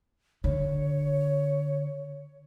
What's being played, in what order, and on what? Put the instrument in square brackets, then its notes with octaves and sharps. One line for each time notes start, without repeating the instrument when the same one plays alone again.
[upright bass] D3 [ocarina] C#5